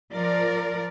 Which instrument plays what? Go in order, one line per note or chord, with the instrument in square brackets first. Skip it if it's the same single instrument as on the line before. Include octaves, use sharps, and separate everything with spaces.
[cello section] F3 A#4 D5